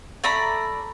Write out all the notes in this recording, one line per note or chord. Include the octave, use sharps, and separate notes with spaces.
A3 D5 A#5 B5